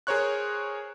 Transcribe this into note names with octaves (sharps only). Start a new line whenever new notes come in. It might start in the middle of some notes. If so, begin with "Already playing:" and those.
G#4 A#4 C5 C#5 C#6 F#6